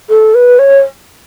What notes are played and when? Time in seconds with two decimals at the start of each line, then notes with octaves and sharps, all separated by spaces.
0.09 A4
0.34 B4
0.59 C#5